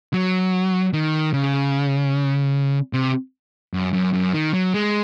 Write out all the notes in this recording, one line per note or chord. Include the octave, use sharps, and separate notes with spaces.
F#3
D#3
C#3
C3
F#2
F#2
F#2
D#3
F#3
G#3